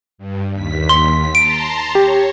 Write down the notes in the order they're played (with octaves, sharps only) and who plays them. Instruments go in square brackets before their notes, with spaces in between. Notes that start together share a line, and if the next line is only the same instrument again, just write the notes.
[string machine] G2
D#2 B6
[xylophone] C6
[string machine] A5 A#5 C6 [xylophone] D7
[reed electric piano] G4 [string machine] C#5